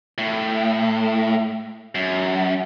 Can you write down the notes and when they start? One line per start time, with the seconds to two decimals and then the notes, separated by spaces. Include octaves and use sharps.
0.18 A2
1.95 F#2